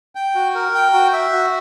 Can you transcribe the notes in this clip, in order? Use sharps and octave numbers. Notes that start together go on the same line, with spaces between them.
G5
F#4
A#4
G5
F#4
E5
F#4